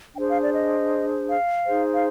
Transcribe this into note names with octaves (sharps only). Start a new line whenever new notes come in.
D4 G#4 C5 G5
F5
D5
D#5
F5
D#4 G#4 C5
F5